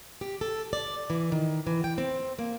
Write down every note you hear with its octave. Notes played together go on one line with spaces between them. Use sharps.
G4
A4
D5
E3
D#3
E3
G5
C4
A#3